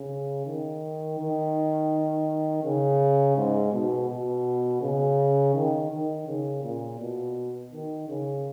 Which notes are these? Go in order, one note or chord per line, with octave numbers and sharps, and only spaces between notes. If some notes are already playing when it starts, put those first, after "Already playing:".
Already playing: C#3
D#3
D#3
C#3
G#2
B2
B2
C#3
D#3
D#3
C#3
A#2
B2
D#3
C#3